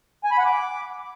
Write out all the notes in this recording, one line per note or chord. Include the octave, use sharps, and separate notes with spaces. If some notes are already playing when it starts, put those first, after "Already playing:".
G#5
B5
F#5
D6